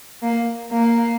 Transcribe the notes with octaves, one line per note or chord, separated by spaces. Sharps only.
A#3
A#3